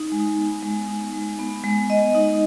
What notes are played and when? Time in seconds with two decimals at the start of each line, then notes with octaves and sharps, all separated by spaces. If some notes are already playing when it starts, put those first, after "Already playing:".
Already playing: D#4
0.12 G#3
0.37 B3
0.63 G#3
0.88 D#4
1.13 G#3
1.39 B3
1.64 G#3
1.90 D#5
2.15 D#4